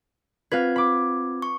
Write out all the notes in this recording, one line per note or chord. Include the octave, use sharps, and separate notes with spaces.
C4 F4 B4 F5 G#6
B5 D6
C#6